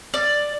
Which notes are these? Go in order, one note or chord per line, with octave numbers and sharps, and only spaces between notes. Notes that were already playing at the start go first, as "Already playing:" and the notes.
D5